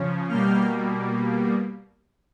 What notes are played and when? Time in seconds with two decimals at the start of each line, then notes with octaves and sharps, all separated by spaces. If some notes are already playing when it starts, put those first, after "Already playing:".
Already playing: C#3 F3 C#4
0.28 B2 G3 A#3 F6 G6